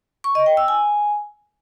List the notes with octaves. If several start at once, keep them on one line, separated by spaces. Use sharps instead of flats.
C#6
D#5
G5
E6
G#5